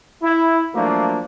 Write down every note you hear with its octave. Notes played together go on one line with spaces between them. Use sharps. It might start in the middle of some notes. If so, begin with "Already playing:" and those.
E4
F3 F#3 A3 A#3 D4